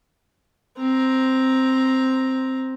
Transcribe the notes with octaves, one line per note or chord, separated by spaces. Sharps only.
C4 A#5